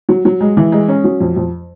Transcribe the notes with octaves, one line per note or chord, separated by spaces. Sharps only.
F#3
F#3
G#3
E3
G#3
C#4
F#3
F2
F2